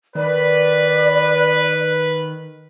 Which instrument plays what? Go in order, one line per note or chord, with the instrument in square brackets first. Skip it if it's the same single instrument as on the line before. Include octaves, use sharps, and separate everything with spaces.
[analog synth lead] D#3 [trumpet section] B4 [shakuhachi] D5